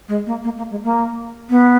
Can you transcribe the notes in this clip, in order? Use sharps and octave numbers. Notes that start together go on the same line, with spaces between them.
G#3
A#3
A#3
A#3
G#3
A#3
B3